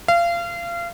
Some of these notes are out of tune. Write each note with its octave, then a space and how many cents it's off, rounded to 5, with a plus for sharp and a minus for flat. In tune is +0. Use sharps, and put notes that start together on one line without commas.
F5 -30